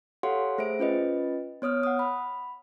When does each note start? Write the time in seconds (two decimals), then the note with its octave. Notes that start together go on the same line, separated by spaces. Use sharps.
0.23 G4 A4 C#5 F5 F#5 C6
0.58 A3 G#4 C5 E5 D7
0.79 C#4 F4 B4 D#5
1.62 B3 C#5 D#6 F6
1.83 F#5 D#6
1.99 B5